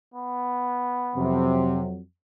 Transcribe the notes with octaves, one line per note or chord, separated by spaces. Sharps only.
B3
F2 C3 F#3